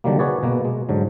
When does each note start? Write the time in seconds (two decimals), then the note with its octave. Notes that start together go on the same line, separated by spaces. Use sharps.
0.04 D3 D#3 F#3 G3 A#3
0.19 F#4 G#4 B4 C#5 D5
0.43 B2 A#3
0.65 G#3
0.89 G#2 D3 F#3